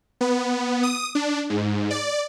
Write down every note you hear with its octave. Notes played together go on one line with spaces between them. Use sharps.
B3
D#6
D4
G#2
D5